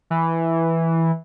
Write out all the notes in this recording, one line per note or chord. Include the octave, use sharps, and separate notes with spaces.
E3